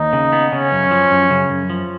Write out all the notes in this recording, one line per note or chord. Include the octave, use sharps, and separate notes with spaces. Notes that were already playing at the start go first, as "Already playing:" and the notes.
Already playing: D#2 D#4
C#3
B3
C#3 C#4
F#2
F3
F#2
C#3
F#2
F3